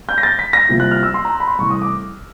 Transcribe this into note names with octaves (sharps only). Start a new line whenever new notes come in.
G6
A#6
A6
B6
A#6
C2 C3 F3 A#3
F#6
F6
E6
C6
A#5
B5
C6
C2 C3 E3 A3 C#6
D#6
D6